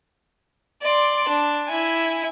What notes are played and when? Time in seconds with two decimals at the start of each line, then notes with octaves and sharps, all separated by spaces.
0.82 D5 C6
1.29 D4
1.68 E4 G#5